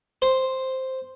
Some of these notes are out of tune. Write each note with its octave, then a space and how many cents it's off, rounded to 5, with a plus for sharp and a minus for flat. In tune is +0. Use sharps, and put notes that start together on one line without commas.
C5 +0